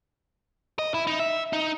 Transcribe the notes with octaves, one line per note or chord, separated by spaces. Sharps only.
D#5
E4
D#4
E5
D#4